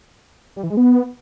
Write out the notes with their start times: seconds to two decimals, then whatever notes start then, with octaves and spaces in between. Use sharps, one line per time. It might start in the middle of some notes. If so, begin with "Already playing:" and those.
0.56 G3
0.63 E3
0.70 G#3
0.77 B3